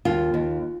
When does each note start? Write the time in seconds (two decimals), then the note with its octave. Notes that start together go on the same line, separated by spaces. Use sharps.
0.05 D#2 F4
0.34 D#2